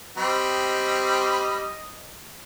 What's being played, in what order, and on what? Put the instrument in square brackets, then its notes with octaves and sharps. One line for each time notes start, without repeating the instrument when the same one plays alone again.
[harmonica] G3 C4 B5 [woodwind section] D#5